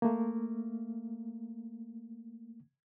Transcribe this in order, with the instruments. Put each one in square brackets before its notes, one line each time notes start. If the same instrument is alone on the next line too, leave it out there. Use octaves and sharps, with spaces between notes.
[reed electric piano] A3 A#3